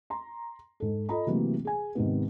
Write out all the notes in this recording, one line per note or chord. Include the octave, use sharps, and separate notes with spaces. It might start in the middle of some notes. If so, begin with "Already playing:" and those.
A#5 C6
G#2 A4
F4 A4 D#5 A#5 B5
C3 E3 F#3 A3 A#3
G#4 G#5
G#2 C3 D#3 B3